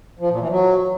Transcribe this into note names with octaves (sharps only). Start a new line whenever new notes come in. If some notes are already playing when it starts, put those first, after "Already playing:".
F3
A#2
E3
F#3